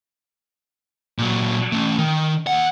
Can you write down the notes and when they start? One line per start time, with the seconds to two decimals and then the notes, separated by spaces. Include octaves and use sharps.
1.18 A#2 F#3
1.72 A3 C#4
1.98 D#3
2.47 D#2 F#5